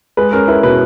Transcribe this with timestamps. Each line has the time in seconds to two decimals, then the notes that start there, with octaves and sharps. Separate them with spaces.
0.17 G#3 B4
0.33 C#4 A#4
0.48 E4 B4
0.63 B2 B4